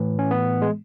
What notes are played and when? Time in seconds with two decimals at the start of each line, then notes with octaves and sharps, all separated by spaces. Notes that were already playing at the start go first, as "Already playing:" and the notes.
Already playing: A2 E3
0.19 C#4
0.31 B3
0.62 G#3